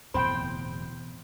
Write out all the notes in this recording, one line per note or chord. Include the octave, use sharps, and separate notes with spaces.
D1 E2 B2 E3 C4 C5 G5 B5